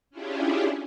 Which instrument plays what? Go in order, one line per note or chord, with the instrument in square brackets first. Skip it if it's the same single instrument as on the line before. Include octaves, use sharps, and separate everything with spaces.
[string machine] C#4 D4 E4 F4 G4 G#4